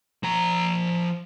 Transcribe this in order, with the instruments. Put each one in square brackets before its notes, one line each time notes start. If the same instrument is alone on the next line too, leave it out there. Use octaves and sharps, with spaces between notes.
[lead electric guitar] F3 A#5